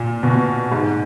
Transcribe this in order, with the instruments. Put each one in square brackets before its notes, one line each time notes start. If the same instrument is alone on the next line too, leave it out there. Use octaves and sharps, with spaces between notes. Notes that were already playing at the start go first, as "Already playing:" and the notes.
Already playing: [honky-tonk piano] A#2
B2
G#2